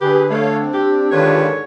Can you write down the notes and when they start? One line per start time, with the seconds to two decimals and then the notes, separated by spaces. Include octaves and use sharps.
0.01 D3 G4 G#4 B4
0.30 A3 D4 C#5 F5
0.60 C4
0.74 G4
1.12 G#2 D3 D#3 D4 F4 B4 C#5